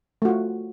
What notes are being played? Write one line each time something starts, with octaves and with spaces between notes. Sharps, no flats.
A3 F4 F#4